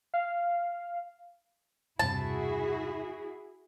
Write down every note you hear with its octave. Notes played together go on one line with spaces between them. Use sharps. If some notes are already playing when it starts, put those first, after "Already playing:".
F5
E1 G2 C3 E4 F#4 G#4 A5